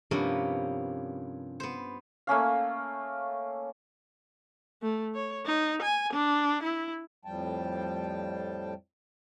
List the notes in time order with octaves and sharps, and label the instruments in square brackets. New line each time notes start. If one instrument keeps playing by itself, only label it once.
[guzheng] G2 C3 F3 A#3 B3 C#4
B3 C5
[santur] A3 A#3 C#4 F5
[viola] A3
C#5
D#4
G#5
D4
E4
[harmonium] F2 A2 F3 G3 G5 A5